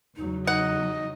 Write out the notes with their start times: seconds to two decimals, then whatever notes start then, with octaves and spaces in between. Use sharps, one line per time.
0.16 E2 C#3 F#3 D#4
0.47 D#4 D#5 F#5